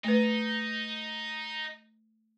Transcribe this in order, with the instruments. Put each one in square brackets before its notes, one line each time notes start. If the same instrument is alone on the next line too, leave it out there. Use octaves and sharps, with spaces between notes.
[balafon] A3 B4 [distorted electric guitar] D#4